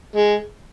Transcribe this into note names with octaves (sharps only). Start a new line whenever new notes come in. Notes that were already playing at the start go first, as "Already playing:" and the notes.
G#3